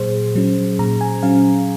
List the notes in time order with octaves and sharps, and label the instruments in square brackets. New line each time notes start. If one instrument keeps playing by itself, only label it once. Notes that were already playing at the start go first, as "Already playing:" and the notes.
Already playing: [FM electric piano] A#2 F#3 G#4 C5
F#3 C#4
A#2 A#5
G#5
F#3 C#4 F5